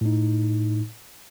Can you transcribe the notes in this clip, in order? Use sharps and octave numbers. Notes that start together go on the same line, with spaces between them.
A2 D#4